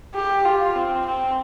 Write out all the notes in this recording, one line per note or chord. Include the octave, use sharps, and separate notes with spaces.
G4
F4
C4
C4